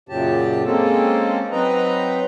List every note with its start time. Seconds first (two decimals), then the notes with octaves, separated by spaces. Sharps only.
0.09 F#2 A#2 C#3 F#3 G4 A5
0.64 G#3 A#3 C4 C#4 A4
1.51 F#3 C4 D#4 B4 D#5 A#5